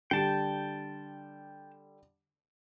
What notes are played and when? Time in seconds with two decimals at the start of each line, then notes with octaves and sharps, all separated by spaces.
0.11 D3 G3 G5 A5